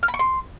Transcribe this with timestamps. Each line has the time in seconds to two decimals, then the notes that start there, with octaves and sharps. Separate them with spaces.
0.03 F6
0.08 B5
0.14 C#6
0.19 C6